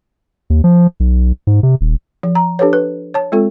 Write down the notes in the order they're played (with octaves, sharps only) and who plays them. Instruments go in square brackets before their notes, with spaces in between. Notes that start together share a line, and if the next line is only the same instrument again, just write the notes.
[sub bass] D#2
F3
B1
G#2
C3
D#1
[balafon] F3
A#5
D4 G4 A4 B4 C#5
B4
C#5 A5
G#3 C4 F4 A4